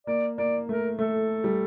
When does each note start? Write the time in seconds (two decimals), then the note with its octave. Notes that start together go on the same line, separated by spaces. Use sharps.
0.07 A#3 D5
0.38 A#3 D5
0.69 A3 A#4
0.99 A3 A4
1.44 G3